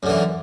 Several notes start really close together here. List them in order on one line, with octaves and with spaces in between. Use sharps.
F#2 D3 E3